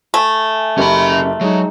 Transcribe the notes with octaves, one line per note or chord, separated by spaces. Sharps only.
A3 G#5
F#1 C#4 G4 B5
F#3 G#3 D#4